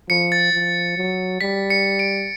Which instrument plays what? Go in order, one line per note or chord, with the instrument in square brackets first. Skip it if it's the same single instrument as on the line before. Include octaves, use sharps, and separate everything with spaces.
[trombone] F3 [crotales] C#7
[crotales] A6
[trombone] F3
F#3
[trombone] G3 [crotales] B6
[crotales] C#7
D7